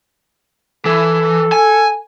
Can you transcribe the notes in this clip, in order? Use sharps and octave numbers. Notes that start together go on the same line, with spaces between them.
E3 A4
G#5